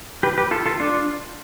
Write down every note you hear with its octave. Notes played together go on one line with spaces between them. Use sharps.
G4 B4
G4 B4
F4 A4
F4 A4
D4 F4